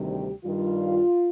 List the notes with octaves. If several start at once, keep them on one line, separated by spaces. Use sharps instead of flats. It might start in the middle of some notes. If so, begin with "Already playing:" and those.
Already playing: D2 C3 D#3 G3
G4
G2 D#3 G3 F4